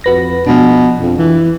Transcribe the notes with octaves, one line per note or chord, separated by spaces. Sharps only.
F2 F#4 B4 A#6
B2 F3 G#3 D4
F2
E3